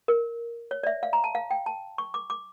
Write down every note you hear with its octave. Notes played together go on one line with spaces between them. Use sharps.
A#4
C#5
D5
E5
F5
A#5
A5
F5
G5
A5
C#6
D6
D6